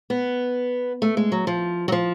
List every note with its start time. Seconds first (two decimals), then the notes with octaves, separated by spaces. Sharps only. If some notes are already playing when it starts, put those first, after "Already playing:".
0.10 B3
1.02 A3
1.17 G#3
1.32 F#3
1.47 F3
1.88 F#3
1.92 F3